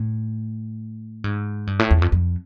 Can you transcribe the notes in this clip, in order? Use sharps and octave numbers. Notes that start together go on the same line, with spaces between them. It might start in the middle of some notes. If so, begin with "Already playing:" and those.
Already playing: A2
G#2
G2
A2
E2
F2
F2